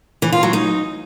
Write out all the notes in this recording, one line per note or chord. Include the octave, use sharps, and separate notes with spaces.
E3
F4
F#3
D#4